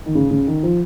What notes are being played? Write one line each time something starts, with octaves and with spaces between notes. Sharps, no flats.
D#3
C#3
C#3
D#3
F3